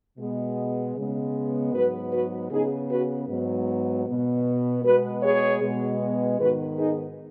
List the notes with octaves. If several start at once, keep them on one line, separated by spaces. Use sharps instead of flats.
B2 G#3 B3
C#3 G#3 B3
G#2 F#3 B3 F#4 B4
F#4 B4
C#3 B3 D#4 G#4
F#4 B4
G#2 F#3 B3
B2 B3
B2 G#3 B3 F#4 B4
G#4 C#5
B2 G#3 B3
G#2 D#3 B3 F#4 B4
D#4 G#4